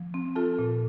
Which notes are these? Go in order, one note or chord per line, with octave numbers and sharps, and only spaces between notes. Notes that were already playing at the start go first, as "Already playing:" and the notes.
Already playing: F3
C4
F4 A4 A5
A#2